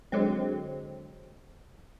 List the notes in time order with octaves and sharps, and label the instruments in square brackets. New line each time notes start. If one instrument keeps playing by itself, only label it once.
[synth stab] D3 F#3 G#3 C4